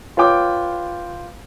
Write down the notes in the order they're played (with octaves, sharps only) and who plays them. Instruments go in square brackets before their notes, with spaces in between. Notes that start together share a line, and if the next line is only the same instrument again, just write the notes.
[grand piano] F4 B4 C#5 G5 D6